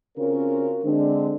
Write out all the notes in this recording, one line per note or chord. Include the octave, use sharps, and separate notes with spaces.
C#3 C4 C#4 F4 F#4 A#4
D3 G#3 C4 D4